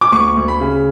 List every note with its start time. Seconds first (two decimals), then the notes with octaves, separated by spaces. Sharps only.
0.01 D6
0.12 D2 C#6
0.37 D2
0.48 B5
0.60 C#3